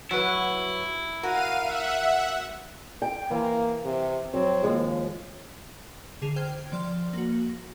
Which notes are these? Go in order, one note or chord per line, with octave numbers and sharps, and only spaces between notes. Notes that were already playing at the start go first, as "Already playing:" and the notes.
F#3 E4 B4
F#4 A#4 F5 D#7
E5 F#5
G5
E3 A#3
C3
F2 F#3 C4
D#2 F3 G#3
D3 G#4 C7 E7 F7
C5 G5 F6 G#6
F3 D5 C6 F6
A#3 F#4